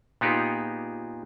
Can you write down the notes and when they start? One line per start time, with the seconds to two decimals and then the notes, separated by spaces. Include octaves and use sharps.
0.21 A#2 B3 D#4 G4 G#4